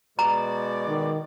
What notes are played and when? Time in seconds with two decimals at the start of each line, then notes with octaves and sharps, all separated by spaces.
0.19 B2 G#3 D5 A#5
0.88 D#3